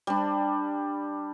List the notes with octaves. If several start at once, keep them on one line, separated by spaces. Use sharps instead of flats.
G3 D4